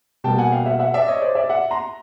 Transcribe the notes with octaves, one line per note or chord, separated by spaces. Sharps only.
B2 G3 A#3 G5 A5
F#5 G#5
F5 G5
E5 F#5
E5 F#5
D5 E5
C#5 D#5
C5 D5
D5 E5
E5 F#5
A#5 C6